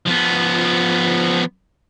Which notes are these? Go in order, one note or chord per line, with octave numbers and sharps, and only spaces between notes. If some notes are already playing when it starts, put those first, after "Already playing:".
F3 B3